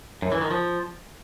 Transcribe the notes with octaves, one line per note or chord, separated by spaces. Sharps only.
F#2
E3
D#3
F3